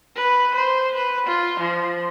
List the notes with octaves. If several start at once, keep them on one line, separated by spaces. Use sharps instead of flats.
B4
C5
B4
F4
F3